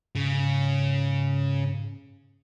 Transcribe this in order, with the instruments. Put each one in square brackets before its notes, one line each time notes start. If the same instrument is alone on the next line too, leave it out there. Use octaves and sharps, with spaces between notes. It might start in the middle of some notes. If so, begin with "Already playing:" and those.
[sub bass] G#2 [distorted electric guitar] C#3